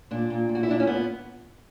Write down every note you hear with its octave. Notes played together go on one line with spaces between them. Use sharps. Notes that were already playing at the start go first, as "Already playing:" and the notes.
A#2 D4
A#2
A#2
F#4
E4
A#2 D4
C#4
A#2 B3